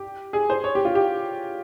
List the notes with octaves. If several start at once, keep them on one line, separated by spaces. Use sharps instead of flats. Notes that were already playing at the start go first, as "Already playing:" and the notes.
Already playing: G4
G#4
C5
C#5
G4
F4
G4